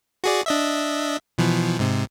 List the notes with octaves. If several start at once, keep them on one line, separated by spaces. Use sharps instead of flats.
F#4 G#4 D5
D4 D#5 E5
B2 E3 F3
G#2 C3